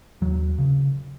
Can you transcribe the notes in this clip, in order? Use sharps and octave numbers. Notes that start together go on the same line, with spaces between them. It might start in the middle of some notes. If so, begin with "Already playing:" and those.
D#2 F#3
C#3